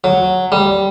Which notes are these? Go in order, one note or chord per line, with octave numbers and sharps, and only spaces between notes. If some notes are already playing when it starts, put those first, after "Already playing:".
F#3
G3